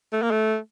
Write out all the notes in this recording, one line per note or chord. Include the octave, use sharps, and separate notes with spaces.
A3
A#3
A3